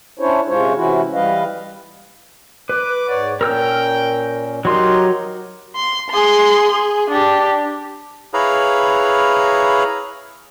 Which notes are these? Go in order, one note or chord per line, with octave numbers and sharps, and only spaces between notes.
C#4 D4 E4 C5 C#5
C3 G#3 C#4 F4 C5 C#5
C3 E3 C#4 E4 F#4
E3 G3 B4 D#5 F5
B4 D6
G#2 C#5 D5 F#5
A#2 C#4 A#4 G5 E6 F6
F#3 D#4 G4 A#4 D#5 C6
C6
G#4 C6
G#4
D4 G4
E4 G#4 B4 C#5 F5 A#5